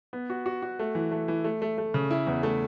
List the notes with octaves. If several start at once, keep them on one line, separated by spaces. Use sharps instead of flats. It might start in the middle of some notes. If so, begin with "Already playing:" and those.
B3
F#4
F#4
F#4
A3
E3
A3
E3
A3
A3
A3
C#3
E4
E2
A3